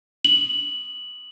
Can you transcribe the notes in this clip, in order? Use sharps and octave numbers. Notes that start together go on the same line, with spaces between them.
F#7